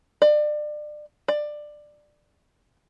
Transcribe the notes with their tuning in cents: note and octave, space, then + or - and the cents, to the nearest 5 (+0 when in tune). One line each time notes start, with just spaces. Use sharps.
D5 +30
D5 +15